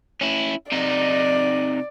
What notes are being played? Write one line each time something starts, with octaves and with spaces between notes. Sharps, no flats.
C#4 E4
C3 D#4 D5